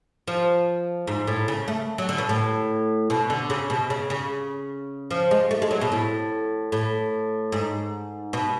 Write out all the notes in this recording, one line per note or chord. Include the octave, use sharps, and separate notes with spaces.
F3
G#2
A2
C#3
A3
F#3
D3
B2
A2
B2
D3
C#3
B2
C#3
C#3
F3
G#3
A3
G#3
F#3
B2
A2
A2
G#2
B2